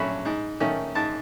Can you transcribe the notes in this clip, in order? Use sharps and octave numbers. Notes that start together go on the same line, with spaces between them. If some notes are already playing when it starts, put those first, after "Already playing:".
Already playing: F#3 A3 C#4 B5
G#2
D#3 A3 C#4
G#2 A5